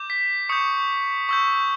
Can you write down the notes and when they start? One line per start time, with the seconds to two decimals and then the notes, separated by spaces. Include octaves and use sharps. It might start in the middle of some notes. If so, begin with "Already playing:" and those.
Already playing: D6 G6
0.10 B6
0.49 C#6 D#6 G6 C#7
1.29 C#6 E6 G6